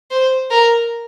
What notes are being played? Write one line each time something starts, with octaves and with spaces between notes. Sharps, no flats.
C5
A#4